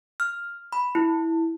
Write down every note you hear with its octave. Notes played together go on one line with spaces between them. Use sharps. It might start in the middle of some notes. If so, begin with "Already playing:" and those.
F6
B5
E4